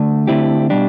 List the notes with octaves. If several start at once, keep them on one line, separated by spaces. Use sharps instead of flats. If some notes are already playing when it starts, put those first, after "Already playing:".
Already playing: D3 A3
D3 A3 C4 E4 G4
B2 G3 D4 G4